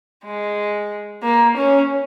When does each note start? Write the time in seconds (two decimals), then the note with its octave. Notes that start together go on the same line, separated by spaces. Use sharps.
0.25 G#3
1.23 A#3
1.56 C#4